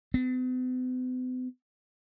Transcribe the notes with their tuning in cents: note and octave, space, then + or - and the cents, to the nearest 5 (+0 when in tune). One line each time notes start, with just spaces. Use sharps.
B3 +45